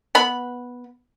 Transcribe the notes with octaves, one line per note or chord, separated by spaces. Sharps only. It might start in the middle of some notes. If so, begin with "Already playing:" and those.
B3 B5